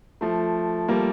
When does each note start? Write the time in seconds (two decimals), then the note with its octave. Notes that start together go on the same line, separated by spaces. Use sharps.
0.21 F3 A3
0.88 G3 A#3